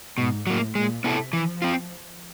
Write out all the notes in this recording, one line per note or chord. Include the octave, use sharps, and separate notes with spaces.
G#2 B2
A2 F#3 A#3
A#2 G#3
C3 B3 E4 A4
E3 F3
C4 F4